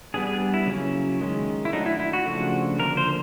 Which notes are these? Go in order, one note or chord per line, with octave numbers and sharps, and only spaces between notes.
G3 B3 D4 G#4
G#4
E4
C#3 F#3 A#3 C#4
D#3 G#3 C#4
E4
F#3 A3 D4 D#4
E4
E4
F#4
C#3 F3 A3 D4
D3 F3 A#3 A#4
C5